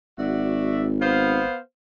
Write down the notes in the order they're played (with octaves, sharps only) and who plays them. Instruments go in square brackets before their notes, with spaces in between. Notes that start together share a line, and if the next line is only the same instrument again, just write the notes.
[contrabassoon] G#1 [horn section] F#4 D5 E5
[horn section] B3 C5 F5